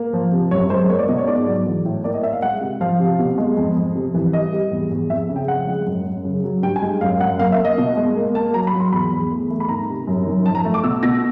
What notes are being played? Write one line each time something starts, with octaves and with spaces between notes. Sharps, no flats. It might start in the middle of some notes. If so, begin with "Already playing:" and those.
Already playing: A#3
F3
C3
F#2 C#5
G#3 C5
A#3 C#5
D5
B2 D#5
C#5
G#2 D5
F#3
E3
A2
A#3 D5
D#5
A#3 E5
F5
G#3 F#5
C3
F3 F5
C3
B2
G#3
F2
F2
C3
E3
G3 D#5
G3
E2
E2
F2 E5
C#3
G5
F3 F#5
G#3
F#2
F#2
C#3
F#3
G2 G5
G#5
G#3
F#2 F5
F#2 F#5
A#3 F5
E5
A#3
D#5
B2
G#3
A#3
A#3 A5
F#3 A#5
B5
F#3
C6
E2 B5
E2
A3
A3
B5
D#3 A#5
C3
F#2
D#3
F3 A5
A#5
A3
D6
B2 E6
B2 A#6